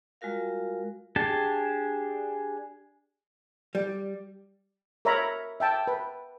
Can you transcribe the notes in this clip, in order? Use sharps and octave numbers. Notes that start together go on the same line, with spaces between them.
G3 G#3 F4 F#4 A#4 F5
D4 G4 G#4 A5
G3
A#4 C#5 E5 A#5 B5
E5 G5 A5
B4